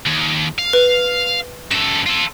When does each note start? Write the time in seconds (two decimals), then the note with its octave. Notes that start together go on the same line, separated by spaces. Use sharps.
0.06 D#2
0.58 F5
0.73 B4
1.71 F#2 A4 E7
2.07 F4 A4